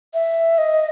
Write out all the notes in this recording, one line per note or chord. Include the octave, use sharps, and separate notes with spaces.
E5
D#5